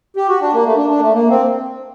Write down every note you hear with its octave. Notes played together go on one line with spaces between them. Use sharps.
G4
F#4
D4
A#3
A3
D4
D4
A#3
A3
A#3
C4